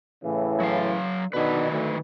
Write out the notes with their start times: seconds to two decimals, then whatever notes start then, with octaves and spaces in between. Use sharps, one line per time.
0.23 A2 C#3 E3
0.60 F#3 F5
1.33 B2 D3 D#3 D#4 B4
1.71 D2